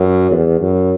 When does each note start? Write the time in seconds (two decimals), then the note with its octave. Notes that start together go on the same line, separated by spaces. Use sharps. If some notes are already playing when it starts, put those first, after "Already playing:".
Already playing: F#2
0.31 E2
0.61 F#2